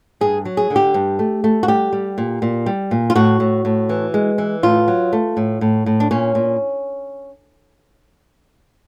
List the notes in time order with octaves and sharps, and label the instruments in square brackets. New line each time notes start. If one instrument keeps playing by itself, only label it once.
[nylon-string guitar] G2 G#4
F#3
G#4
D3
G4
G2
A3
A3
F#4
G3 G4
G3
A#2
A#2
G3
A#2
F4
A2 F#4
A2
A2
E3
G#3
E3
A2 F4
F#3
A3
A2
A2
A2
D4
A#2 C#4
A#2